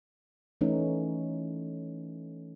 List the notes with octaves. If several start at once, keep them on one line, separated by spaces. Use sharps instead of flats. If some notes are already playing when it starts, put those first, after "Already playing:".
E3 A3 C#4 D#4